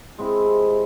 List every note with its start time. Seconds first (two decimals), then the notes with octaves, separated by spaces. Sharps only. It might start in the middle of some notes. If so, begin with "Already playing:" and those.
0.18 G#3 C4 E4
0.46 C3